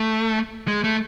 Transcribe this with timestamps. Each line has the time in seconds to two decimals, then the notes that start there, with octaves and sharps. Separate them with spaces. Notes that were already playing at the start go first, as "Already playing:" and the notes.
Already playing: A3
0.68 G#3
0.84 A3